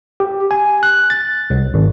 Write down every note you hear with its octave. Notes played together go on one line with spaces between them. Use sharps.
G4
G#5
F#6
A6
C2
G#1